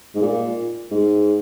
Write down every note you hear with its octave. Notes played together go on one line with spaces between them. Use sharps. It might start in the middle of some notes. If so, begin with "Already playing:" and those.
G#2
A#2
G#2